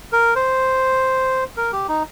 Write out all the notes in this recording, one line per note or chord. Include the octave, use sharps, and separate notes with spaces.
A#4
C5
A#4
G4
D#4